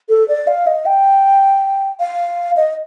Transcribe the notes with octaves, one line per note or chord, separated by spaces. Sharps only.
A4
D5
F5
D#5
G5
F5
D#5